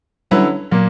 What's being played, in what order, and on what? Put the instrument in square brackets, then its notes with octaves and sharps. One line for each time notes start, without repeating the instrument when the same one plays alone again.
[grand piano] D3 F#3 C#4 E4 B4 [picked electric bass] G3
[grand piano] A#2 A#3 [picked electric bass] F#3